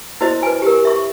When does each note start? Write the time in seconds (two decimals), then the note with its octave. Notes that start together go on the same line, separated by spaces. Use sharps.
0.21 E4 F#4 C5 D#5
0.43 B4 G#5
0.62 G4 A#4
0.85 E5 C#6